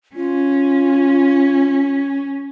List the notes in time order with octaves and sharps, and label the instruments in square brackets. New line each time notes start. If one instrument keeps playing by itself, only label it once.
[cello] C#4 [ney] F4